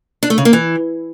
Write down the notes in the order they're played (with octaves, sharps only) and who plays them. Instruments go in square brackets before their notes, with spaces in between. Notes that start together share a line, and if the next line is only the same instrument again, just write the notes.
[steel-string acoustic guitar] D4
A3
C#3
A#3
E3